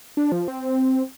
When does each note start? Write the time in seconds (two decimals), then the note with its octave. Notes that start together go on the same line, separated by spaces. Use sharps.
0.17 D4
0.32 F3
0.48 C4